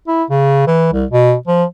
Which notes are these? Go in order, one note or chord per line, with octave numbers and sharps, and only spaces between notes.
E4
C#3
E3
C2
B2
F3